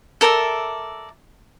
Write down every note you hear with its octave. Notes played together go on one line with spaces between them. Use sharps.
A4 A#4 D5 E5